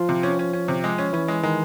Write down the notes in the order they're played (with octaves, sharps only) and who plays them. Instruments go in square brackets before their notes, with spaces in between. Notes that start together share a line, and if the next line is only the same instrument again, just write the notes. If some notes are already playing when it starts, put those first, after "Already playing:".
Already playing: [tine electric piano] F3 F4
[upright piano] C3
C#4
C#4
C#4
C3
G#3
C#4
[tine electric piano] E3 E4 [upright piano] C#4
[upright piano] G#3
[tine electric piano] D#3 D#4 [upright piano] G#3